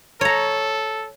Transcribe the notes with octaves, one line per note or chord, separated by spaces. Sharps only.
A4 C#5 A#5